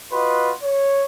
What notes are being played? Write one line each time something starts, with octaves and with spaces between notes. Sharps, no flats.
F4 F#4 B4 D#5 C6
C#5